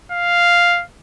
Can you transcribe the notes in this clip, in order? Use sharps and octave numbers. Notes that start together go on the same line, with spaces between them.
F5